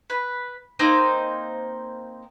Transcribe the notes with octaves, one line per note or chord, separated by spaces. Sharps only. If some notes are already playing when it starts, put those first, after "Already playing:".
B4
A#3 C4 D#4 C5